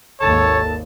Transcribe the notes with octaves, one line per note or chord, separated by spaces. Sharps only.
G#1 D#2 A4 C#5 A5